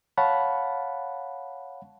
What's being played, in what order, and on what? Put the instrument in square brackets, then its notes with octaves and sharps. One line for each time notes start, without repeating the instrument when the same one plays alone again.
[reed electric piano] C#5 F5 F#5 A5 B5